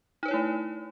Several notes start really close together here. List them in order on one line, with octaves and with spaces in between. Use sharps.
D#4 B4 C#5 E4 A3